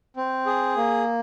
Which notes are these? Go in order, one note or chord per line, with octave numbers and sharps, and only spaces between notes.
C4
G#4
A#3